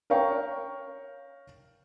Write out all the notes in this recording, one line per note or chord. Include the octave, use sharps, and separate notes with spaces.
A#4 C#5 F5 G5 C#6